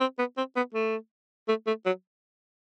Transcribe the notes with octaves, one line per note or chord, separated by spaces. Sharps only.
C4
B3
C4
B3
A3
A3
A3
F#3